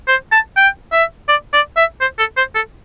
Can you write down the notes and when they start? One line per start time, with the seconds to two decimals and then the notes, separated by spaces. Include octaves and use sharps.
0.08 C5
0.32 A5
0.57 G5
0.93 E5
1.28 D5
1.54 D5
1.77 E5
2.01 C5
2.19 A4
2.37 C5
2.55 A4